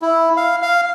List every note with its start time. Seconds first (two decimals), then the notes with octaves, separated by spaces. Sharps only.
0.02 E4
0.37 F5
0.62 F5